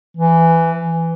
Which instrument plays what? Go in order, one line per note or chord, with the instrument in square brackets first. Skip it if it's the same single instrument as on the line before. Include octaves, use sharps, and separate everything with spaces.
[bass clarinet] E3